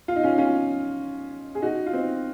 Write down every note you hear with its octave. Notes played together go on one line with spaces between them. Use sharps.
F4
D#4
C#4 F4
C#4 F4
G#4
D#4 F#4
F4
C4 D#4